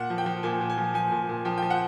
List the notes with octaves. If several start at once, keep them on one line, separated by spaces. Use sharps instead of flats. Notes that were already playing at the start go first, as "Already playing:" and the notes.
Already playing: A#2 F#5
F3
G5
F3
A#2 G#5
A#2
G#5
F3
F3 G#5
A#2
A#2
F3 G5
F3 G5
F#5